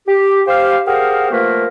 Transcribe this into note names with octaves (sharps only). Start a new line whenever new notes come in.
G4
G4 C5 F5
G4 G#4 A#4 C5 F5 F#5
F3 A3 A#3 A#4 B4